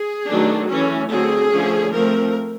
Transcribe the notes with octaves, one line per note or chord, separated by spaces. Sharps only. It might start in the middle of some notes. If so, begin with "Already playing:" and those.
Already playing: G#4
D#3 F#3 A3 D4
E3 A3 C#4
D3 F#3 A3 C4 G#4
D3 F3 A3 C#4
F3 A3 C4 A#4